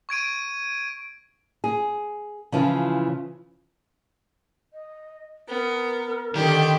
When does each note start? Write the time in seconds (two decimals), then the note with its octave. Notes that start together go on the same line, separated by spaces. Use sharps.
0.09 C#6 G#6 D7 D#7
1.64 G#4
2.52 C#3 E3 F3 C4 F4
4.73 D#5
5.48 B3 A#4
6.35 D3 D#3 G4